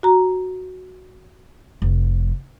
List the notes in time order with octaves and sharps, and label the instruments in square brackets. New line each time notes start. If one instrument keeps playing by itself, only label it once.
[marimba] F#4 A#5
[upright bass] F1 F3